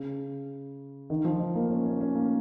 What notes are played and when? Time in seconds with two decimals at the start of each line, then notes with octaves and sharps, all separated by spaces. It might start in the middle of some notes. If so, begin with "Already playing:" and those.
Already playing: C#3
1.10 D#3
1.25 F3
1.39 D#4
1.55 A#3
1.70 C#4
1.86 C#4
2.00 C#4
2.15 A#3